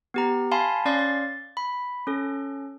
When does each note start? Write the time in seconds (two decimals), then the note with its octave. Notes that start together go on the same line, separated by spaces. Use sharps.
0.14 B3 G4 A#5
0.52 F5 G#5 A5 B5 C6
0.85 C#4 D5 F5 C6 A6
0.99 A6
1.57 B5
2.07 C#4 A4